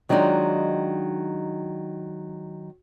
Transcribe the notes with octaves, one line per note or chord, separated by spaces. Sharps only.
D#3 F#3 G#3 D4 D#4 F4